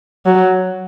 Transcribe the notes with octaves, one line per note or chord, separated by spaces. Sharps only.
F#3